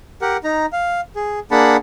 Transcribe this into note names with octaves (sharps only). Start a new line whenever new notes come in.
G4 A#4 F#5
D#4 A#5
F5
G#4
A#3 D4 G#4 F#5 A5 B5